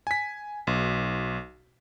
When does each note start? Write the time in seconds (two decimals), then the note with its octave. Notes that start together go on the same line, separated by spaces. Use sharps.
0.07 G#5 B6
0.67 B1